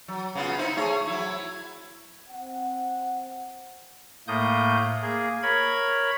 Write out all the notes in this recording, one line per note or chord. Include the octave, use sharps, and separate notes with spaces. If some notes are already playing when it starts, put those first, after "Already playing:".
F#3
C#3 B3 F4
D#4 E4 C5
A3 G#4 C#5
F#3 E4
C4 F#5
A2 A3 A#3 D#6 G6
A#3 G#4
A#4 C#5 B5 G#6